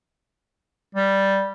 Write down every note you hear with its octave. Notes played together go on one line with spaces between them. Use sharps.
G3